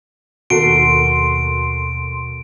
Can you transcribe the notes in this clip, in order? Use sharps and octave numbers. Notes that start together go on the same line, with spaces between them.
D#2 B2 F#4 A4 A#4 C6 D7